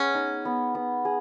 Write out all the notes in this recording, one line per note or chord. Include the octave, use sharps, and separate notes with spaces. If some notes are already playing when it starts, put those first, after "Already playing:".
Already playing: B3 C#4 G#4
D#4
B3
B3
G#4